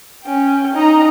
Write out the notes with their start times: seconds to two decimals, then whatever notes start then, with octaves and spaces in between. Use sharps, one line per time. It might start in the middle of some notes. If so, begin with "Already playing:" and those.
0.24 C#4 G5
0.74 D#4 A#5